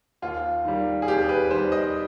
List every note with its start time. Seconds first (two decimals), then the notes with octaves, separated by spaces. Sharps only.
0.22 D#2 F4
0.65 D#3 G3
1.02 G#4
1.08 D#2 G4
1.22 G#4
1.29 B4
1.51 D#3 G3 C5
1.72 D#5